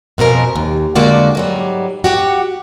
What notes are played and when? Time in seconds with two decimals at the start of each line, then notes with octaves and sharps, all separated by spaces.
0.18 F2 B2 F3 A#4 G#5
0.56 D#2
0.95 F2 D3 G#3 A#3 F#4 D5
1.35 G#2 F#3 G3
2.04 F#4 G4 F#5